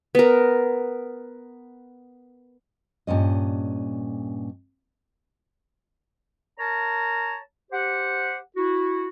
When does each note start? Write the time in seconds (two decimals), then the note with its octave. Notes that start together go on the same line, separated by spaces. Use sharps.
0.15 B3 A#4
3.07 G2 A#2 C#4 D#5
6.58 A#4 C#5 A5 A#5
7.71 G4 C5 F#5
8.56 E4 F#4